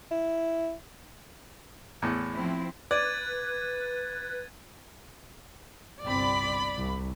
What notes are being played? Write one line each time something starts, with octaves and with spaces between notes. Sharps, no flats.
E4
E2 A2
F3 C4 E4
B4 D5 G#6 A6 D#7
G1 C2 C4 D5 B5
C2